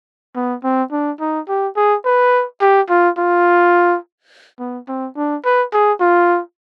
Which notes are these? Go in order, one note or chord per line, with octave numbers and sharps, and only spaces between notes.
B3
C4
D4
D#4
G4
G#4
B4
G4
F4
F4
B3
C4
D4
B4
G#4
F4